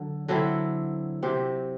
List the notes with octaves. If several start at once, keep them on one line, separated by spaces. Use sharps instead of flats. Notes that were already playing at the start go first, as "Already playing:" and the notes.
Already playing: D3 F#3
D3 F#3 C4 E4
C3 F#3 C4 G4